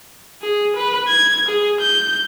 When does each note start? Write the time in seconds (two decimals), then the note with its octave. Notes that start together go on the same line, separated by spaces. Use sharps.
0.42 G#4
0.76 B4
1.08 G#6
1.48 G#4
1.81 G6